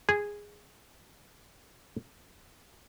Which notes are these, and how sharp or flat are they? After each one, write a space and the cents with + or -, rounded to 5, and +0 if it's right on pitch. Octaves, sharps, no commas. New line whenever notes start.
G#4 -10